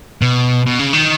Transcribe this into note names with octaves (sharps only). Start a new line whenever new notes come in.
B2
B2
C#3
D#3